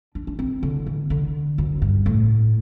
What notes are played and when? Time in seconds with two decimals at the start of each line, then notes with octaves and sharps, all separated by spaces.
0.15 D4
0.27 D4
0.39 C4
0.63 D3
0.86 E3
1.10 D3
1.58 F#2
1.82 G2
2.06 A2